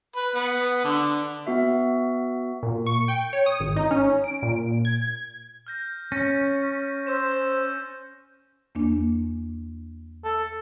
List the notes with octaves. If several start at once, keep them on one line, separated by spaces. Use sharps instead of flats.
B4
B3
D3
B3 F#4 E5
A#2
C#6
G5
C#5
D#6
G#1
D#4
C#4
D7
A#2
G#6
F6 G6 A#6
C#4 A6 A#6 D#7
C5 E6 G6 E7
E2 A#3 D4
A4